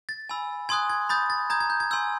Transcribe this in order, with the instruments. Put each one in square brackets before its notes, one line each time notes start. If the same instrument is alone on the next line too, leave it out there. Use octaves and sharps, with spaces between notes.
[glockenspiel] A6
G#5 B5 E6
G#5 C6 D#6 F#6 G#6
G#6
B5 D#6 G6 A6
A6
A#5 D#6 G6 G#6
G#6
G6
G#6
G#5 C6 E6 G6